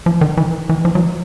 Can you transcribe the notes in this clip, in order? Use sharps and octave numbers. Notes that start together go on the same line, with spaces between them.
F3
D#3
E3
E3
F3
F#3
F3